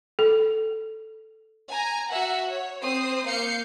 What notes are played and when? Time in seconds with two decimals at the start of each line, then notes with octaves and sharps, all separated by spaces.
0.19 A4
1.73 G#5 A#5
2.10 F#4 E5 F#5
2.49 C#5
2.82 C4 C5 D#6 C7
3.27 A#3 F5 G6 C7 C#7